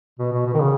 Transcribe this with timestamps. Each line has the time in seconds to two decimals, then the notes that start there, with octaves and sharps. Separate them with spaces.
0.19 B2
0.33 B2
0.46 B2
0.54 D#3
0.60 C#3